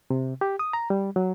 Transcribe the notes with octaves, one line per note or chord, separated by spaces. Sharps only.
C3
G4
D#6
A#5
G3
F#3